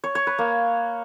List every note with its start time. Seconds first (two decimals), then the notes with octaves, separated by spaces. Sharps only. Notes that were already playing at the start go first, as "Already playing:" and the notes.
0.04 C#5
0.15 C#5
0.27 B4
0.38 A#3